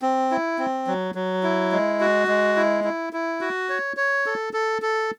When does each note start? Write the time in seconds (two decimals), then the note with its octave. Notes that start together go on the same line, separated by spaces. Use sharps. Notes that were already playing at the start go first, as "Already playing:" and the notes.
0.02 C4
0.31 E4
0.59 C4
0.87 F#3
1.15 F#3
1.43 E4
1.72 G#3
2.00 F#4
2.28 G#3
2.56 E4
2.84 E4
3.13 E4
3.41 F#4
3.69 C#5
3.97 C#5
4.26 A4
4.53 A4
4.82 A4